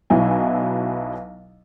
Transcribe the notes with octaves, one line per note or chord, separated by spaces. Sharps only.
B1 B2 F#3 E4 G#5